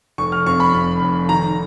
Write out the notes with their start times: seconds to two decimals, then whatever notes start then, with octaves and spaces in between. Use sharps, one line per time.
0.18 F1 C#6
0.32 F6
0.46 F2 C#6
0.60 B5
0.73 F2
1.02 F1
1.29 D#3 A#5